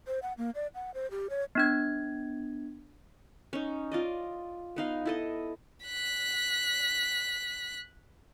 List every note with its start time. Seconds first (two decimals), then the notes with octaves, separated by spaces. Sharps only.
0.07 C5
0.22 F#5
0.38 A#3
0.55 D5
0.75 F#5
0.94 C5
1.11 G4
1.30 C#5
1.55 B3 D4 G#6
3.53 C#4 D#4
3.92 F4 D5 D#5
4.76 B3 D#4 F5
5.05 E4 A4 D#5
5.85 F#6 B6